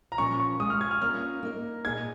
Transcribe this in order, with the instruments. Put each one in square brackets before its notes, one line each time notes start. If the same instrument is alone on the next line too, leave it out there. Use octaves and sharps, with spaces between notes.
[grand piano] A#5
[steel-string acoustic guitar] A#2 F3 A#3 C#4 [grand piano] C#6
[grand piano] C#6
[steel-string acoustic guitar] G#3 F4 G#4 [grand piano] D#6
[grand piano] F6
G#6
F6
[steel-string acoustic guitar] A#3 C#4 F4 A#4 F5 [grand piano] F6
[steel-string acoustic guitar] A#3 D#4 A#4
[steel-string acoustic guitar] A#2 A#3 D#4 G#4 D#5 [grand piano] G#6